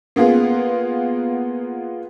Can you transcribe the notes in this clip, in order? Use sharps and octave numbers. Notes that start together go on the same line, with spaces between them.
A#3 B3 F4 G#4